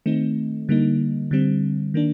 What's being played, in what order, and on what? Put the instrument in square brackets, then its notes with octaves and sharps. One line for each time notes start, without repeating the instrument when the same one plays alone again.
[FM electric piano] D#3 A3 C4 D#4
D3 G3 A#3 D#4
D3 G3 C4
D#3 A#3 D4